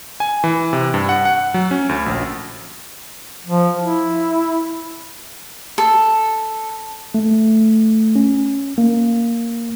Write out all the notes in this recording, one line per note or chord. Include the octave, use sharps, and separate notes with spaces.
G#5
E3
C3
G2
F#5
F#5
F#3
C#4
D2
A#1
F3
E4
A4
A3
C#4
A#3